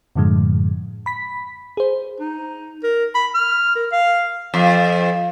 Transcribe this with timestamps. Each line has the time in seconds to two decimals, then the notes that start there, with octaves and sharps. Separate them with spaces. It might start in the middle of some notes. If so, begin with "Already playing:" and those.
0.16 F#2 A2 D3 F3 G#3
1.06 B5 B6
1.77 G#4 C5
2.20 D#4
2.83 A#4
3.14 B5
3.34 F6
3.76 A#4
3.92 F5
4.54 F2